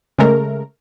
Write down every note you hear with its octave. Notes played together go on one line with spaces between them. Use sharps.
C#3 G#3 A3 A#4